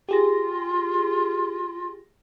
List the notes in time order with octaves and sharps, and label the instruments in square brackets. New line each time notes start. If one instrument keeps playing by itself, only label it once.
[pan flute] F4 [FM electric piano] G4 G#4 A#6